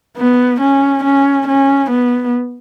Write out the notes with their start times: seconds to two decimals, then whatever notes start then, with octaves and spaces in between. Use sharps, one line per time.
0.17 B3
0.61 C#4
1.04 C#4
1.47 C#4
1.90 B3